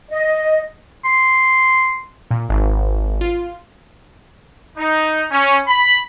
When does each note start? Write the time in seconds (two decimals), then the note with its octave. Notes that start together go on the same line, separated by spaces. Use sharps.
0.09 D#5
1.05 C6
2.31 A#2
2.49 G#1
3.21 F4
4.77 D#4
5.32 C#4
5.68 B5